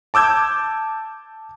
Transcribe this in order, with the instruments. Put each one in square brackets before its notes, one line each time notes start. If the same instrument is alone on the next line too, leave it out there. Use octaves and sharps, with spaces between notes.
[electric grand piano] A5 D6 E6 G6 G#6